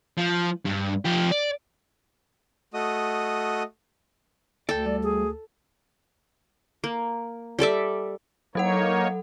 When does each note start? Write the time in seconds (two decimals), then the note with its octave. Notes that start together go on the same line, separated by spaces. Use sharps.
0.17 F3
0.65 G2
1.05 F3 G4
1.32 D5
2.74 A3 F#4 D#5 D#6
4.69 D2 A4 D5 G5
4.86 G3 D5
5.03 G#4
6.84 A#3
7.59 G3 A4 D5 E5
8.55 F#3 A#3 D#4 A4 C#5 F#5